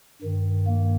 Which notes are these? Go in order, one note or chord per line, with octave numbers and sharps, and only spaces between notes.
G2 D#3
A#3